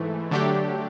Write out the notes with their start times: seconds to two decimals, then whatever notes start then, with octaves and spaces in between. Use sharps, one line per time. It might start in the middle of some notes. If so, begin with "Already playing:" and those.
Already playing: G#2 E3 A3
0.31 D3 F#3 A3 D4 G4